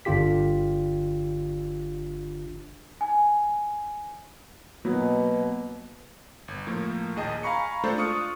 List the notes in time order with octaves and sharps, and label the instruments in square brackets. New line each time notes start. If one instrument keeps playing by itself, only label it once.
[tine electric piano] G1 D3 D4 F4 G4 B6
[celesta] G#5
[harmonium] B2 [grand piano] F#3 A#3 B3
[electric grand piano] G1
A2 F3 A#3
A#1 D#2 G#4 D#5 G5 A5
F5 G#5 A#5 B5 C#6 C#7
G#3 A3 D4 F4 A4 C5
D4 F4 C#6 D#6 F6 C#7